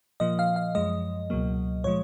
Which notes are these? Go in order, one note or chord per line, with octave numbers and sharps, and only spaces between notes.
A#2 F3 A#3 D#5
F5
F5
F#2 F3 G#3 D#5
C#2 B2 F#3 A#3
A#2 F3 G#3 C#5